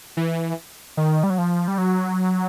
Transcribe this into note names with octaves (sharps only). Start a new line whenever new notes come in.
E3
D#3
G3
F#3
F3
G3
F#3